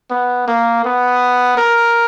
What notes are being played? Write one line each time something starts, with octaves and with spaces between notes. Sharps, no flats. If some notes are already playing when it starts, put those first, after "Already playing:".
B3
A#3
B3
A#4